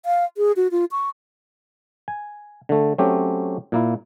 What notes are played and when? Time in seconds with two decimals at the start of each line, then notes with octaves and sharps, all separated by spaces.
0.06 F5
0.37 G#4
0.56 F#4
0.71 F4
0.91 C#6
2.08 G#5
2.69 D3 A3
2.98 F#3 A3 C4 C#4 G4
3.72 A#2 A#3 E4